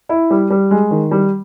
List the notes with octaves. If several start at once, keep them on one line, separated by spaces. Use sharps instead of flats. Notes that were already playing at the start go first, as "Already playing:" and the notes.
E4
G3
G3
G#3
D#3
G3